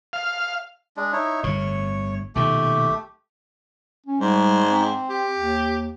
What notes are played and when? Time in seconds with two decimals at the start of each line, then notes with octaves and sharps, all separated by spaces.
0.13 F5
0.97 G#3 D4
1.13 D#4 E4 C#5
1.43 G1 A2 C#5
2.35 B1 A#2 D#3 A3 G4
4.06 C#4
4.21 G#2 G3
4.69 C4
5.10 G4
5.37 D#2